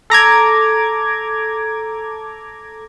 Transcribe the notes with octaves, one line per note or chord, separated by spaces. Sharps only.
A4 A#5 D6 G#6